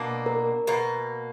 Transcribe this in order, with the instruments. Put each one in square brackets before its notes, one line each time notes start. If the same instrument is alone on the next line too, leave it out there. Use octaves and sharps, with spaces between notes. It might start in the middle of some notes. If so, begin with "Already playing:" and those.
Already playing: [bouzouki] B2 A#3 D4
[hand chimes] A#4
[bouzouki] B2 A#3